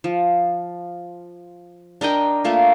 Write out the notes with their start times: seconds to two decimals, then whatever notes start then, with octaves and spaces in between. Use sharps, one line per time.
0.04 F3
2.01 D4 A#4 D#5 G5
2.44 A3 A#3 F4